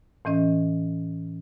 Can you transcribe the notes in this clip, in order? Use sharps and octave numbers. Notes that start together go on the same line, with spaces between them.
A2 E3 C#4 D#5